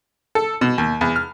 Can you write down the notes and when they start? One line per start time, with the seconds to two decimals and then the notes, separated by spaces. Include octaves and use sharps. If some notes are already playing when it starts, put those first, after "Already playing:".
0.35 A4
0.61 B2
0.78 D#2
1.01 E2
1.16 F6